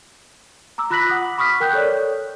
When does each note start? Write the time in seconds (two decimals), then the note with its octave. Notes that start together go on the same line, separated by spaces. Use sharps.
0.78 A#5 D6 E6
0.90 F4 B5 F#6 A#6 B6 F#7
1.09 F#5 D6 D#6
1.38 B5 C#6 D#6 F6 B6
1.60 A#4 G5 F#6 G6
1.73 A4 C#5 D5